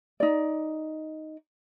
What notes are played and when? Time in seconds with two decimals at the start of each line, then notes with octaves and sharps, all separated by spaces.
0.20 D#4 D5